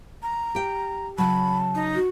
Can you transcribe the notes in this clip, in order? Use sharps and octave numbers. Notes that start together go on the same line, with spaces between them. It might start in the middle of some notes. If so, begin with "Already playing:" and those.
A#5
G4 G5
C#3 F#3 A5 B5
D#4
F#4